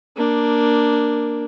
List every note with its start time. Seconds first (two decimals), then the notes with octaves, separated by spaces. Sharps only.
0.17 A#3 D4